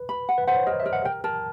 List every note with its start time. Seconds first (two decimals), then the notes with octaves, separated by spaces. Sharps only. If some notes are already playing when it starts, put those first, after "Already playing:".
Already playing: B4
0.09 B5
0.29 F#5
0.38 B4
0.47 C5 F#5
0.57 C#5
0.67 A#4 D#5
0.80 E5
0.86 A#4
0.93 F#5
1.05 A#4 G5
1.24 A#4 A5